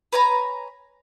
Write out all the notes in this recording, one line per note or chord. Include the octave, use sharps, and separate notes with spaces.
B4 C#5 G#5 A#5